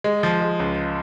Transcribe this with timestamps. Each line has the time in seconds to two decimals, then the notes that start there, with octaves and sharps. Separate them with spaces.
0.04 G#3
0.23 F3
0.41 G#3
0.60 C#2